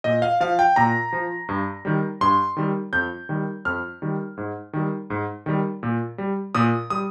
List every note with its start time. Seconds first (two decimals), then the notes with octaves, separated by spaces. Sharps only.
0.04 A#2 D#5
0.22 F5
0.40 F3 F5
0.59 G5
0.76 A#2 A#5
1.13 F3
1.49 G2
1.85 D#3 G3
2.21 G2 C6
2.57 D#3 G3
2.93 F2 G6
3.29 D#3 G3
3.65 F2 F6
4.02 D#3 G3
4.37 G#2
4.73 D#3 G3
5.10 G#2
5.46 D#3 G3
5.83 A#2
6.18 G3
6.55 A#2 D#6
6.90 G3 D#6